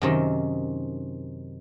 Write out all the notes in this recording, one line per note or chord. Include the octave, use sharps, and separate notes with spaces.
F#2 C3 D#3